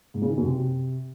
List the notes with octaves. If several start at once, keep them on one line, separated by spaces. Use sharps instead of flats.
G#2
C#3
D#3
F#2
C3